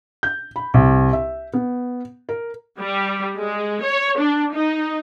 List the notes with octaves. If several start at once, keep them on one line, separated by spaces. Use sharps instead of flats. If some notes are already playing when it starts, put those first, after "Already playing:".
G6
B5
C2
E5
B3
A#4
G3
G#3
C#5
D4
D#4